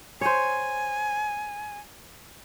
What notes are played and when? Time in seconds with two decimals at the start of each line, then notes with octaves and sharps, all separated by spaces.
0.21 C5 C#5 G#5